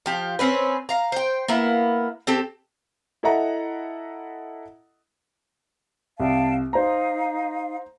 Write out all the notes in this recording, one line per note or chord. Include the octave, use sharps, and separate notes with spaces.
F3 G4
C4 C#4 B4
F5 A#5
C5 G5
A#3 B3 E4
C4 G4 A4
E4 A4 D#5 E5 F#5 A#5
C2 F5 G5 A5
D#4 C5 F5 A#5